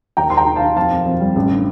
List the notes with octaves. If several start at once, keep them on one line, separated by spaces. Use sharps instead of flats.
D#2 G5 A#5
D#2 C6
G5 A#5
D#3
F5 A5
D#3
F2 F5 A5
F2
F2
G3
A1
D3